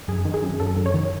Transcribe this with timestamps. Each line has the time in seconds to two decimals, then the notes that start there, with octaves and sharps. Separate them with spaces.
0.08 F#2 G#4
0.25 D#3
0.34 G#4
0.42 F#2
0.60 F#2 A4
0.77 F#2
0.86 C#5
0.94 D#3